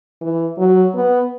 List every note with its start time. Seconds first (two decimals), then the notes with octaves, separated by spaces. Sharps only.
0.21 E3
0.58 F#3
0.95 B3